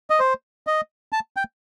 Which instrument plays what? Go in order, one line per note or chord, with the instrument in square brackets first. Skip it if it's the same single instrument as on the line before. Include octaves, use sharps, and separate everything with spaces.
[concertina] D#5
C5
D#5
A5
G5